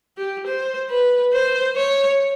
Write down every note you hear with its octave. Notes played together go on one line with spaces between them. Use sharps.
G4
C5
B4
C5
C#5